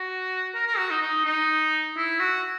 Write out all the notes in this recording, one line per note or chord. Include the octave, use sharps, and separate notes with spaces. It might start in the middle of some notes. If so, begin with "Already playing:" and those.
Already playing: F#4
A#4
A#4
F#4
D#4
D#4
D#4
E4
F#4